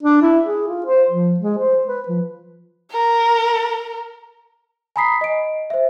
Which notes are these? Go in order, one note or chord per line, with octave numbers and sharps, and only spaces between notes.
D4
E4
G#4
F4
C5
F3
G#3
C5
B4
F3
A#4
G#5 A#5 B5 D#6 B6 C7
D#5 D7
C5 E5